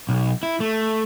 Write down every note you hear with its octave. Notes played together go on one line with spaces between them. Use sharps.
B1
E4
A3